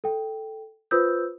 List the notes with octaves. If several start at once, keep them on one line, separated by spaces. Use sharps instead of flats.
A4 G5
F4 B4 C5 D#6 E6 G6